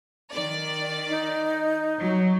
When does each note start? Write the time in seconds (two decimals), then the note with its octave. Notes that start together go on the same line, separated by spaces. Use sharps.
0.32 D#3 D5
1.10 D#4
1.98 F#3